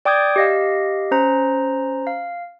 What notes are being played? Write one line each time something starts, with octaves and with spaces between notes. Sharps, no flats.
D5 G5 D6 D#6 G6 G#6
G4 D#5 F5
C#4 C5 A#5
F5